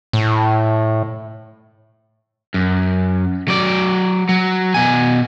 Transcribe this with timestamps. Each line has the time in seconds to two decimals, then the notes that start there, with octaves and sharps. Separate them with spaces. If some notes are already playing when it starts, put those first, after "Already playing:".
0.13 A2
2.54 F#2
3.48 F#3 D5
4.29 F#3
4.74 B2 G#5